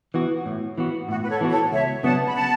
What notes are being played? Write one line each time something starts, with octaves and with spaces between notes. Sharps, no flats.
E3 B3 F#4
A2
E3 B3 F#4
A2 F#4
B4
A4 C#5
E3 B3 F#4
A4 C#5
C#2 C#5 E5
C#3 F#3 B3 D4 F#5 A5
B5
F#5 A5